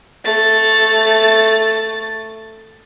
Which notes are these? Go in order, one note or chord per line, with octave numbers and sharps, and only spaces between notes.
A3 A6